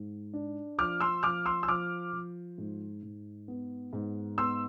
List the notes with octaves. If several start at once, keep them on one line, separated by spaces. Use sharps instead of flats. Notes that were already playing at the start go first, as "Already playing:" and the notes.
Already playing: G#2
D4
F3 D6 F6
C6 E6
F3 D6 F6
C6 E6
E6
F3 D6 F6
F3
G#2
G#2
B3
G#2
B3 C6 E6